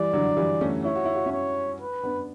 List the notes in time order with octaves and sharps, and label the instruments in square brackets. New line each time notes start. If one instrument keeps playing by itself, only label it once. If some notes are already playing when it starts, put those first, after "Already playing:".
Already playing: [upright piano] E3 G3 [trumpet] D5
[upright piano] D3 F#3
E3 G3
A3 C#4
[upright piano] E4 [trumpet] C#5
[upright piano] F#4
E4
F#4
C#4 E4
[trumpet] C#5
B4
[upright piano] B3 D4